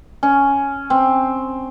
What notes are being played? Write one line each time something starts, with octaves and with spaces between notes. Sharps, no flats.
C#4
C4